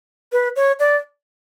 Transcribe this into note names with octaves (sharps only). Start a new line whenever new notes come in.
B4
C#5
D5